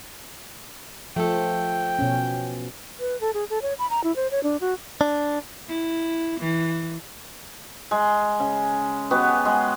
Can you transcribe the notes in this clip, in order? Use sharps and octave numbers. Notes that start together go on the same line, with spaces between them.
F3 A3 A4 G5
B2 C#4
B4
A4
G#4
A4
C#5
B5
A#5
E4
C5
C#5
D4
F#4
D4
E4
E3
G#3
C#3
G#3 B3 F#4 G4
G#3